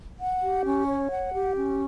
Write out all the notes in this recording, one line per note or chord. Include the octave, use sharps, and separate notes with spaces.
F#5
G4
C#4
C#5
F#5
G4
C#4